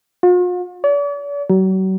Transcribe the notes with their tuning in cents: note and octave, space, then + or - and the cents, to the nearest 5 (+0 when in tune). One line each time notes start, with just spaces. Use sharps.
F4 +45
D5 -45
F#3 +35